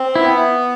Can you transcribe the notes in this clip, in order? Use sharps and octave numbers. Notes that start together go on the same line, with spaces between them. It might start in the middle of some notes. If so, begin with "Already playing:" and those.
Already playing: C4
B3 E4